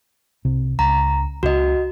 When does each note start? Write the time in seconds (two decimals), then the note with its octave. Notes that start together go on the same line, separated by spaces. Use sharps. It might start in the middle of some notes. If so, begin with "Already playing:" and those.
0.45 C2 C3
0.79 C#2 A#5
1.43 C#2 C#3 F#4 D#5